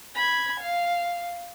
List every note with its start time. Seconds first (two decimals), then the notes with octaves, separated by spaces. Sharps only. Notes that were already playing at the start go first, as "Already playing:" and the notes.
0.15 B5 G#6
0.60 F5